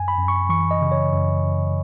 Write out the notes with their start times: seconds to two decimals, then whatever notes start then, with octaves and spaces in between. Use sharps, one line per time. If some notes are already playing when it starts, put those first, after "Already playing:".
Already playing: F#2 G#5
0.08 B5
0.18 F#2
0.28 C#6
0.49 E3 C#6
0.71 D#5
0.81 C#3
0.92 C#5
1.13 F#2
1.44 F#2